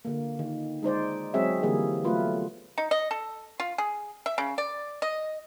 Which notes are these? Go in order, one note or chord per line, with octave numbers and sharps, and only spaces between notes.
D3 A#3
D#3
G#3 D#4 C5 D5
F#3 G#3 C4 G#4 C#5 E5
D3 E3 G3 A#3 G#4
F#3 A3 B3 F4 B4
D#4
D#5
A4
F4
G#4
E5
C#3
D5
D#5